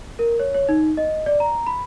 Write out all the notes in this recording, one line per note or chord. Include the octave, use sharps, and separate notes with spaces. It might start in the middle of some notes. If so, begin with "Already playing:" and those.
A#4
C#5
C#5
D#4
D#5
D5
A#5
B5